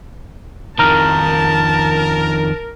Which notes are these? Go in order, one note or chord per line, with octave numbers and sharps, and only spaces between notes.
F2 D#3 A#4 A5 A#5 F6